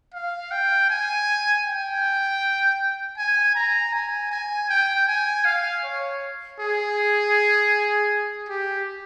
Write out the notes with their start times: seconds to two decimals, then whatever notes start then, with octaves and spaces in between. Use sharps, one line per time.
0.14 F5
0.51 G5
0.90 G#5
1.65 G5
3.17 G#5
3.55 A#5
3.93 G#5
4.31 G#5
4.69 G5
5.08 G#5
5.45 F5
5.84 C#5
6.60 G#4
8.49 G4